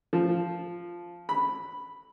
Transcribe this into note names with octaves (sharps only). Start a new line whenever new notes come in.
F3
B5